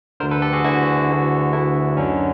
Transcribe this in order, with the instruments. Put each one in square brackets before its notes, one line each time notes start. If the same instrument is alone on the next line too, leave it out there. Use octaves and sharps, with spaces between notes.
[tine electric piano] D3 A#4 C5
D2
A4 B4
G4 A4
F#4 G#4
D2 D3 E4 F#4
D2 D3
D2 D3 D4 E4
F#2 D3 C#4 D#4